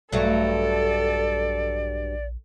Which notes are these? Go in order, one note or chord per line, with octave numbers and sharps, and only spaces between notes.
A#1 G2 F#3 A3 A4 D5